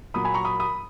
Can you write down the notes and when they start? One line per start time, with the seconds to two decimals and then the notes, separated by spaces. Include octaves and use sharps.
0.14 A#2 F#3 B5 D#6
0.25 G#5 B5
0.34 A#5 C#6
0.45 B5 D#6
0.60 B5 D#6